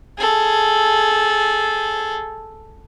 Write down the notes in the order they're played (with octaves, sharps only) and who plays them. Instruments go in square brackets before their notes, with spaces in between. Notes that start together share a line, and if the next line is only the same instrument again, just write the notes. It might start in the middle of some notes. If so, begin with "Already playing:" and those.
[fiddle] G#4 A4